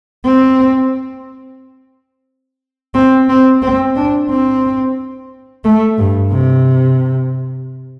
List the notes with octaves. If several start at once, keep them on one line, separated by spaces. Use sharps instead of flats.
C4
C4
C4
C4
D4
C4
A3
G2
C3